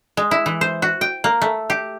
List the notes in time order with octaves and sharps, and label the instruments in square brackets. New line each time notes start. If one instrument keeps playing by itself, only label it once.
[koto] G#3
E4
E3
C5
F#4
G5
A#3
A3
G4